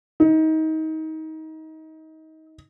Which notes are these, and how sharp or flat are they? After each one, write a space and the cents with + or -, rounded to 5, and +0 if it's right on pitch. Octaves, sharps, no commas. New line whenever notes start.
D#4 +25